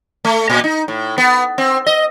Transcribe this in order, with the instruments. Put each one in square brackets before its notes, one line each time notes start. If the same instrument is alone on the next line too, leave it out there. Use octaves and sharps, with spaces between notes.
[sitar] A3
A#2
D#4
A2
B3
C4
D#5